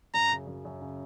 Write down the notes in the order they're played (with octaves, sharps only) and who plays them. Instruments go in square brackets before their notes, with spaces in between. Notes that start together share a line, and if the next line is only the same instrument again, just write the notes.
[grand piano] F#2 [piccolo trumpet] A#5
[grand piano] C#3
F#2
F#2
C#3